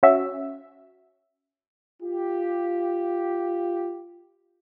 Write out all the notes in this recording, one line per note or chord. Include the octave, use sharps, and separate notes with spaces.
C#4 F#4 E5
F4 G4